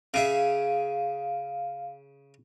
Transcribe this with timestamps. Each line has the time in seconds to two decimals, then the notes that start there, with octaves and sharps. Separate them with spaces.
0.14 C#3 G#4 E5 F5